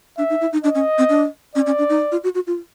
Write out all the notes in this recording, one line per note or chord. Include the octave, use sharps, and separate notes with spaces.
D4 E5
D#4
E4
D#4
D4 D#5
C#4
C4
D4
C#4 D5
C#4
D4
D#4
F4
F#4
F#4
F4